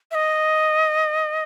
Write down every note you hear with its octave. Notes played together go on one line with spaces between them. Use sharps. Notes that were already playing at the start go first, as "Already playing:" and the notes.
E5
D#5